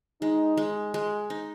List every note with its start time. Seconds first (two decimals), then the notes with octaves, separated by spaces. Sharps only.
0.22 G#3 D#4
0.57 G#3
0.94 G#3
1.30 D#4